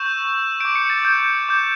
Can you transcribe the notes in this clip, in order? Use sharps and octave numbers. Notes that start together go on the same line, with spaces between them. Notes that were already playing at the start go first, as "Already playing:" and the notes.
Already playing: C#6 E6 G6 E7
D6 G6 D7
C#7
A6
G6
D6 G6 E7